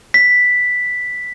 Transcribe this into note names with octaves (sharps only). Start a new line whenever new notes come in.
B6